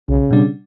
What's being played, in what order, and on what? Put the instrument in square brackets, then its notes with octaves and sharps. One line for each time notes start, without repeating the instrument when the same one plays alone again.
[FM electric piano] B1 [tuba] C#3
[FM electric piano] B2 G3 D4